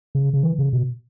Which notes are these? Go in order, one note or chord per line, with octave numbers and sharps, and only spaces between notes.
C#3
C#3
E3
C#3
B2